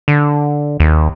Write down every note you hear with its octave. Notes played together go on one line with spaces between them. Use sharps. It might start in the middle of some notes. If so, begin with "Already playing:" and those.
D3
D#2